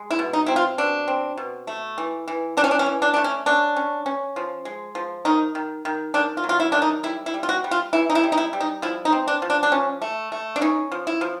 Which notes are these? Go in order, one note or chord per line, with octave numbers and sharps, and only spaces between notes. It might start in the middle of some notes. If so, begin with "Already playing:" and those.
Already playing: G#3
E4
B2
D#4
C4 E4
F4
B2 D4
C4
B2
A3
E3
E3
E3 D4
C#4
D4
C#4
E3
D4
A3 D4
C#4
C#4 D4
C#4
C#4
F3
G#3
F3
D#3 D#4
D#3
D#3
D#3 D4
F4
F#3
F4
E4
D#3 D4
D#4
G3 E4
E4
G3
F4
F#4
G3
F4
E3 E4
D#4
E4
G3
D#4
E4
G3
D#4
F3 E4
D#4
C4
D4
F3
D4
D4
F3 C#4
A3
A3
D4
C#4 D#4
F3
E4
F3